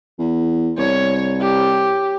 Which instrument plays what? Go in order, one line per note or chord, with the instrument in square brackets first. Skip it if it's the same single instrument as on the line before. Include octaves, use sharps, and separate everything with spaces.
[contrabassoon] E2
[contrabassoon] C2 [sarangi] C#5
[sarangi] G4